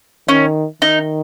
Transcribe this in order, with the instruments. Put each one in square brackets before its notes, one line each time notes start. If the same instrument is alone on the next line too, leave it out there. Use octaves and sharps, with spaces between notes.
[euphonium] D#3 [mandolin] C#4
[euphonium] D#3 [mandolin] D#4